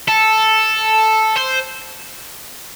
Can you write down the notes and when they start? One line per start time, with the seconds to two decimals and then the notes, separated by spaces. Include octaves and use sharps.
0.08 A4
1.36 C5